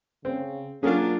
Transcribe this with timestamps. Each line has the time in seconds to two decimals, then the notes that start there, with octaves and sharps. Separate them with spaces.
0.25 C#3 C4
0.83 F#3 A#3 C#4 D4 F4 G#4 A#4 F5